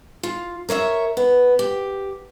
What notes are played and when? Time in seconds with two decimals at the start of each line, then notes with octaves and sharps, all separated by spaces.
0.23 F4
0.69 A#4 C#5 D5 E5
1.17 B3
1.59 G4